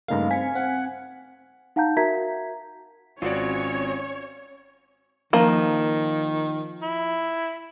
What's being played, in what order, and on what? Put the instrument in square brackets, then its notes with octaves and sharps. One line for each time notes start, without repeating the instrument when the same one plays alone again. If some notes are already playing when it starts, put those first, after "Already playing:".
[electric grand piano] G2 C#3 A3 [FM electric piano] A#3 D#4 A#5 [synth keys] F5
[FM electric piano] C4 G#6 C#7 [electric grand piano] G#5 B6
[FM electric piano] C4 [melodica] F#5
[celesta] D#4 F5 F#5 A5 A#5 G6
F#4 A#4 E5 A#5 G#6 B6
[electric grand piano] G#1 F#4 D5 [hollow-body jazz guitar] C4 F4 [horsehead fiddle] C#4 [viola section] C#5
[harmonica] D#3 [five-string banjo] F3 A#3 A#4
[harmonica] E4